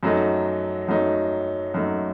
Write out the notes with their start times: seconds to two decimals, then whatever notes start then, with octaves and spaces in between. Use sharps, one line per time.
0.03 F#2 F#3 A3 D#4
0.88 F#2 F#3 A3 D#4
1.74 F#2 F#3 A3 D#4